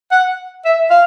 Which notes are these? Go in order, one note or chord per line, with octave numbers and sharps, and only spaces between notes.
F#5
E5
F5